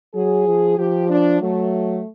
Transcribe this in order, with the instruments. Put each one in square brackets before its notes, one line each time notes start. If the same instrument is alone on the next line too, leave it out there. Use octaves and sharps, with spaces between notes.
[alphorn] F#3 [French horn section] G#4
[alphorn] F3
[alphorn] F3 [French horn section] G4
[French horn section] D4
[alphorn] F#3 [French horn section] A3